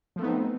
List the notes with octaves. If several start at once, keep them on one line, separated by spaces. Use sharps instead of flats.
F3 A3 B3 C4 D#4